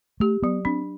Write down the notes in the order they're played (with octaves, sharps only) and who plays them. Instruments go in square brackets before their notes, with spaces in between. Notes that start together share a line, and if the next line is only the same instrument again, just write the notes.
[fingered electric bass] A3 [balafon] G4
[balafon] F#3 [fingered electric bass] B3
[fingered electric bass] C4 [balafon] D4